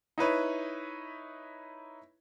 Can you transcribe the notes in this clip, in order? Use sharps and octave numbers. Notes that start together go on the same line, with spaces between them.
D#4 E4 B4 C#5